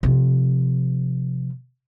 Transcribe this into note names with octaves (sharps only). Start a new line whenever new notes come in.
C3 F3